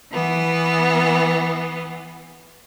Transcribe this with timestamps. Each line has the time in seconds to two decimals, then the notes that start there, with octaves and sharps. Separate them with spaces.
0.13 E3 B3